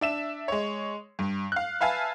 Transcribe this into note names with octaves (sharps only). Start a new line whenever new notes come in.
D4 E5 E7
G#3 C#5
G2
F5 F#6
B4 E5 F5 G#5 A5